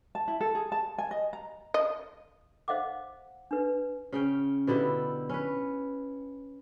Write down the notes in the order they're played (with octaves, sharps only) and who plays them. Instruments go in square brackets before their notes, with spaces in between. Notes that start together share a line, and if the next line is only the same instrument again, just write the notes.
[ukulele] A5
E4
A4
G#4
A5
G#5
D#5
A#5
[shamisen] D#5
[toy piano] C5 D#5 F5 F#5 D6
D4 B4
[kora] C#3 C#4 G5
B2 D3 E4 G4
C#4 B4